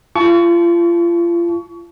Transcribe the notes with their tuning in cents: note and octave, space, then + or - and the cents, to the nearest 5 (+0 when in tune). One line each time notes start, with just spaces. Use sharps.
F4 -35 A5 -25 C#6 +25